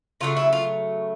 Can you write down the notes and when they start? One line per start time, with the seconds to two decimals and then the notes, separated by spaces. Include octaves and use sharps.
0.21 C#3 F#3 A3 F4
0.36 E4
0.53 F4